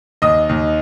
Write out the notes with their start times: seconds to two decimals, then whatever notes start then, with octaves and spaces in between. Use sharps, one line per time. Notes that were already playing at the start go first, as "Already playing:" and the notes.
0.22 D#2 D#5 D#6
0.49 D#2